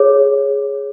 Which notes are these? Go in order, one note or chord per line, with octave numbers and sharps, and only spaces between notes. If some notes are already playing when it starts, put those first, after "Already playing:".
Already playing: G#4 C#5